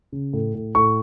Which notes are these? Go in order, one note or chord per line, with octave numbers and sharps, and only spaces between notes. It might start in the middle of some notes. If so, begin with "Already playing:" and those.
C#3
A2
A2
A2 C#6